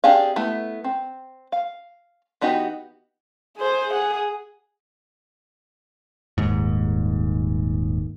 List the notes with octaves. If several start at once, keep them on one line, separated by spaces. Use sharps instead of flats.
C4 D4 G4 G#4 F5
A3 B3 E4
C4
F5
E3 B3 D#4 F#4 G4
G#4 C5
G#4 F#5
D#1 D#2 G#2